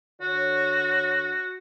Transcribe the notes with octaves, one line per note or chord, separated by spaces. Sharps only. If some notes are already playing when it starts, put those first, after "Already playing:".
D3 F#4 C#5